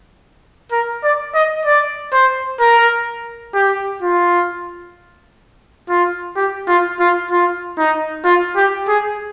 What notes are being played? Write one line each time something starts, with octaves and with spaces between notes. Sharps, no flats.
A#4
D5
D#5
D5
C5
A#4
G4
F4
F4
G4
F4
F4
F4
D#4
F4
G4
G#4